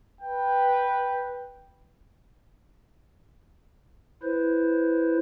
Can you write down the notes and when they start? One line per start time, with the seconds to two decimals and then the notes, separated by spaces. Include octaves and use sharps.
0.21 B4 G5
4.23 E4 B4 C5